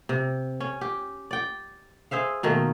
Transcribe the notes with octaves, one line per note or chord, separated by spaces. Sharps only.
C3
C#4
G4
D5 G5
G#4 C5 E5 F5
B2 D#3 A3 A#3